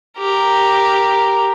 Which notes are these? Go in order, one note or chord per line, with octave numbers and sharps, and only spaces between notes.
G4 A#4